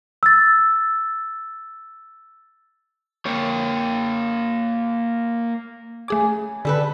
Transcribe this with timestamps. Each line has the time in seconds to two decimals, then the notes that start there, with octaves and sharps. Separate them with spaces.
0.23 E6 A6
3.26 A#3 C#5
6.08 C#3 A3 G#4 G#5 D6
6.65 D3 G3 A4 B4